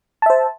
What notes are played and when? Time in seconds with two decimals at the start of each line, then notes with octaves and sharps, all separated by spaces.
0.22 A5
0.26 E5
0.30 C5